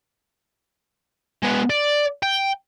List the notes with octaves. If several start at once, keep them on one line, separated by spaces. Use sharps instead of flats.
G#3 B3
D5
G5